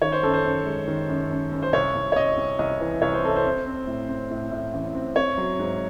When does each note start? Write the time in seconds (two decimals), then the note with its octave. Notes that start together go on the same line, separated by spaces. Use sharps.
0.02 D#3 C#5
0.12 C5
0.23 F#2 A4
0.34 C5
0.45 F#2
0.65 G#3
0.87 D#3
1.09 F#2
1.30 F#2
1.52 F#2
1.62 C5
1.73 C2 C#5
1.95 C2
2.12 C#5
2.16 C2 D#5
2.37 C2
2.59 C2 D#5
2.80 E3
3.02 C2 C#5
3.14 C5
3.23 C3 A4
3.36 C5
3.45 C4
3.66 C4
3.87 A2
4.09 C4
4.31 A2
4.51 A2
4.73 A1
4.95 C4
5.16 C4 C#5
5.38 F#3
5.59 G#2